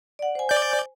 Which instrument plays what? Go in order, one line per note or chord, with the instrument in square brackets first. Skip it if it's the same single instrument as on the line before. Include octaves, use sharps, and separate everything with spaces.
[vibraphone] D5 F#5
C5 G#5
[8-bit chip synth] D5 G6